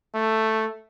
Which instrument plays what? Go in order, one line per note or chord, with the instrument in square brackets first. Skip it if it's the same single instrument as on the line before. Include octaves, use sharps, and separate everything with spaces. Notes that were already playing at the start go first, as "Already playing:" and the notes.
[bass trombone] A3